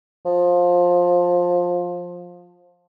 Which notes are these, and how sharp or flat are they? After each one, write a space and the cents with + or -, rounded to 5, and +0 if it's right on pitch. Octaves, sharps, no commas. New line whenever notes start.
F3 +15